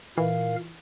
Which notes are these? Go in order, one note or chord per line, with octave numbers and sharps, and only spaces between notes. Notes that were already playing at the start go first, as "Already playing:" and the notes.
A#2 E3 A#4 F5